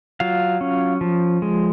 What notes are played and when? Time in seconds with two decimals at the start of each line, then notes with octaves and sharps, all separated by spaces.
0.20 F#3 F4 F5
0.61 C#4
1.01 F3
1.42 G#3